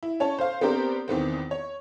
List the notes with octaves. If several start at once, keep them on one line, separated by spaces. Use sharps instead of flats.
E4
C#4 C#5 A5
C5 F5
B3 C4 D4 G4 A#4 C5
E2 D#3 B3 C4
C#5